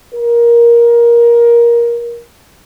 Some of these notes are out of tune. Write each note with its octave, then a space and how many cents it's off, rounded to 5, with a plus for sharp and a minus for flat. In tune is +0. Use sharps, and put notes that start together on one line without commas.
A#4 +15